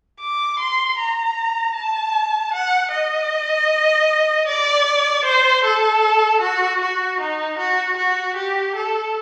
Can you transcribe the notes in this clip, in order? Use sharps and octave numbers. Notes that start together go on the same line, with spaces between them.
D6
C6
A#5
A5
F#5
D#5
D5
C5
A4
F#4
F#4
D#4
F#4
F#4
G4
A4